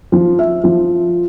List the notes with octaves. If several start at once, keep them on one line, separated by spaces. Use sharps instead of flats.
F3
E5
F3